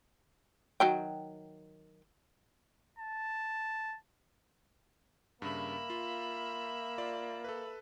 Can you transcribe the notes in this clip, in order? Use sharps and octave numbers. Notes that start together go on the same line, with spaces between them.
D#3 F#3 G5
A5
G2 C#3 A#3 E5 B5
F4
F4 D5
A4 B4